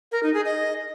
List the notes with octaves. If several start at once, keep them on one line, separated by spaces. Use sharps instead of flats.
A#4
D#4
G#4
D#5